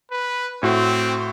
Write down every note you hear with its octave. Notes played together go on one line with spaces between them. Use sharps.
B4
A2 C4 F#4